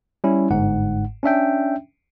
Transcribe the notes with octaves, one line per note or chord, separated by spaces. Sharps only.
G3 C#4 E4
G1 G#2 F#5
C#4 D4 E5 G5